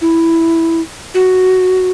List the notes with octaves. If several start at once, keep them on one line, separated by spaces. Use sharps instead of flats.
E4
F#4